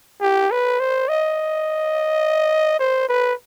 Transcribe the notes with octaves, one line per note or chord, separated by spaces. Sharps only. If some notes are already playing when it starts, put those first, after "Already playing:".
G4
B4
C5
D#5
C5
B4